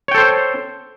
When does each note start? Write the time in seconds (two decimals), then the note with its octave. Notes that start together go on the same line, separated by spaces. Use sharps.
0.08 C#5
0.11 G5
0.15 A4
0.18 C5